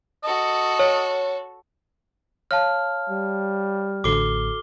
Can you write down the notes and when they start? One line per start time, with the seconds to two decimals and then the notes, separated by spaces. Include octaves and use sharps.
0.24 F#4 A4 D#5
0.79 C#5
2.51 C#5 F5 A5 F6
3.09 G3
4.04 A1 A2 D3 F#4 A4 D6 C7 G7